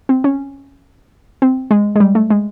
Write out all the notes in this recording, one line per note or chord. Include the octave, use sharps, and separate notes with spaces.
C4
C#4
C4
G#3
G#3
G3
A3
G#3